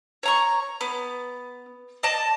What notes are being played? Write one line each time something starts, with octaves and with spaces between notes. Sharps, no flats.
C#5 A#5 C#6
B3
D5 D#5 A5